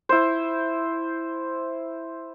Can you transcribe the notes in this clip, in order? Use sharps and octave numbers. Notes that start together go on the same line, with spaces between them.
E4 C5